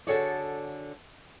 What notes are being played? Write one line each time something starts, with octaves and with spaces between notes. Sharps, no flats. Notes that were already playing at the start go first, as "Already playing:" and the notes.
D3 F#4 G#4 A4 C#5 D5